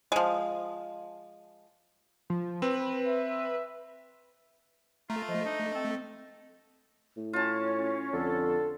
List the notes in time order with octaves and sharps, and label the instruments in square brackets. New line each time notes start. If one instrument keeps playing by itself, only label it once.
[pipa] F3 G#3
[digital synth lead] F3
[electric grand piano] C4 [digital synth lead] B4
[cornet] E5
[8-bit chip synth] A3 [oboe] F4 [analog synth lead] A#5
[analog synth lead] F3 [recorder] D#5
[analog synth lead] D4 [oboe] D#4
[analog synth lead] C4 [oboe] A4
[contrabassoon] A2
[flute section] C#4 C#5 [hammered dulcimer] F4 A5
[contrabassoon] F2 [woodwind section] D3 A4